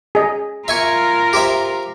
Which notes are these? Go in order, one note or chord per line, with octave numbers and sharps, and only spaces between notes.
G#4 D#5
F4 A#4 E5 G#5 C#6
G4 C5 E5